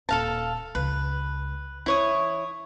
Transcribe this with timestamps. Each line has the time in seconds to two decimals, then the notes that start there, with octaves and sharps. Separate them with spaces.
0.09 D#1 A4 F5 A5
0.75 C#2 B4
1.86 E3 E4 C#5 D#6